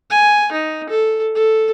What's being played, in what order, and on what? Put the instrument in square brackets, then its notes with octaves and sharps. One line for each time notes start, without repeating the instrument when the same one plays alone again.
[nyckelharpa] G#5
D#4
A4
A4